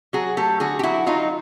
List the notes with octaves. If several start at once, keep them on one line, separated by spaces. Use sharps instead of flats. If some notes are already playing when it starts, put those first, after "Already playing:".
F#3 F#4 G#4
A3 G4 A4
D3 F#4 G#4
G4
F#3 E4 F#4
F#3 D#4 F4